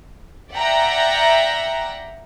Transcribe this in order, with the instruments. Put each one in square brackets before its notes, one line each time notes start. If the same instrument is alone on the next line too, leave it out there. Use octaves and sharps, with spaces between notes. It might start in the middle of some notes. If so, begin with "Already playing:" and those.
[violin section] D5 E5 F#5 G5 A#5